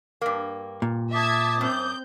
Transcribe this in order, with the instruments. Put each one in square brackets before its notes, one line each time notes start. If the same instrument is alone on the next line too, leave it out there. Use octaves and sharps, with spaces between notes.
[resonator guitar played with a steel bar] G2 A#3
[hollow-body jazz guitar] A#2
[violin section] E5 A5 G#6 [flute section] D6 D#6
[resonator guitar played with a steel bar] F#2 [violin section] C4 G6